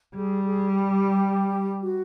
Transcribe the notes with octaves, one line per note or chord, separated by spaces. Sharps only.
G3 G#4
G#4
G4
F#4